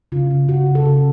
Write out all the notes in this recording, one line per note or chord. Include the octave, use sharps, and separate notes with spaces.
C#3 F4
C#3
C#3 F#4
C#3
A4
C#3